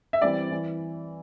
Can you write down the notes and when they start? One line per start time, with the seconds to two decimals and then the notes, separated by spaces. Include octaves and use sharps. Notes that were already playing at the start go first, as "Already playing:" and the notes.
0.13 E5
0.22 E3 G3 C4 D5
0.51 E3